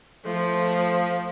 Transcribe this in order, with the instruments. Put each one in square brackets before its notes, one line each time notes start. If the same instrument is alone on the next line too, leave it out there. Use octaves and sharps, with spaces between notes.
[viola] F3 [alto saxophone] A3